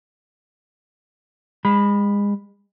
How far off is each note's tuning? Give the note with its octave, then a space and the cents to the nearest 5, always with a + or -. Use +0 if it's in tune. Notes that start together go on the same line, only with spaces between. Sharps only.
G#3 -35 B5 +0